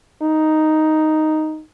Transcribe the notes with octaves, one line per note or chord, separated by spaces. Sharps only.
D#4